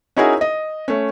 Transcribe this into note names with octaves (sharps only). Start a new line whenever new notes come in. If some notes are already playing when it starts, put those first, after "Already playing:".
C#4 D#4 E4 F#4 G#4 A#4
D#5
A3 C#4